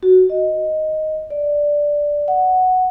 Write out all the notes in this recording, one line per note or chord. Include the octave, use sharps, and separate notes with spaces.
F#4
D#5
D5
F#5